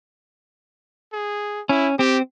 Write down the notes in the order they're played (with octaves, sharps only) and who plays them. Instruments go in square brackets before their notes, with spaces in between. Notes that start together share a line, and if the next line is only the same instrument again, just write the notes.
[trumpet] G#4
[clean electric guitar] C#4 [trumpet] E4
[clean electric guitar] C4 [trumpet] G4